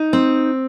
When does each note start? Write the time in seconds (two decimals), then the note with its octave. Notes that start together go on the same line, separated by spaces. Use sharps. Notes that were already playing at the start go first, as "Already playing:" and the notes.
Already playing: D#4
0.13 C4